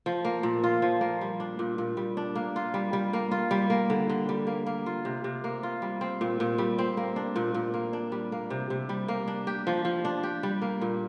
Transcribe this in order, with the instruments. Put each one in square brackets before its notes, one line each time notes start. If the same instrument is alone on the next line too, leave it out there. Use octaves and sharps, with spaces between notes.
[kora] F3
A#3
A#2
F4
F3
A#3
G3
D4
A#2
A#2
G3
D4
A#3
F4
G3
G3
A#3
F4
G3
A#3
D3
D3
G3
A#3
A#3
F4
C3
C3
A#3
F4
G3
C4
A#2
A#2
G3
C4
A#3
D4
A#2
A#2
A#3
D4
G3
A#3
C3
C3
G3
A#3
D4
G4
F3
F3
D4
G4
G3
A#3
A#2